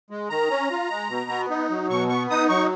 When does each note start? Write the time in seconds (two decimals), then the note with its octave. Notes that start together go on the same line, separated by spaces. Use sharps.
0.10 G#3
0.30 D#3 A#5
0.50 C#4
0.71 F4
0.90 G#3
1.09 B2
1.30 B3
1.50 D#4
1.70 F#3
1.90 B2 C#6
2.09 B3 C#6
2.30 D#4 D#6
2.49 F#3 C#6